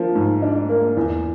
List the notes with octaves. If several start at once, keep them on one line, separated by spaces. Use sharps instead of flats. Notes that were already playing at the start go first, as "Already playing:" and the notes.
Already playing: F3 A#3 D4
G#2
D4
A#3
E2